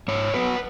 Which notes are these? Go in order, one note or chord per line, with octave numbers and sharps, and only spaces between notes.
G#2 C#5
F#3 B3 B4